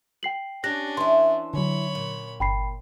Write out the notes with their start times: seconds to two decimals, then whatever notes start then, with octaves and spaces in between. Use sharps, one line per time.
0.23 G5 C7 F#7
0.64 C#4 D4 G4 F#6 A#6
0.97 E3 E4 C6
1.54 D3 F#3 C#5 B5
1.95 A#2
2.40 G1 G5 B5 C7